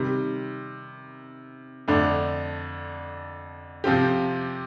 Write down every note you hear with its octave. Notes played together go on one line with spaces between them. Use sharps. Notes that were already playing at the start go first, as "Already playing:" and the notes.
Already playing: C3 D#3 G3
F2 D3 A3 D4
C3 F3 C4 G4